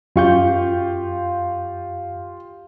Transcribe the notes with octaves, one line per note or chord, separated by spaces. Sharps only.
F#2 F4 G4 F5 C#6 G6